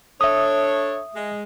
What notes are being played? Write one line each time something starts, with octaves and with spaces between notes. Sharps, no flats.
D4 A4 C#5 E5 D#6
G#3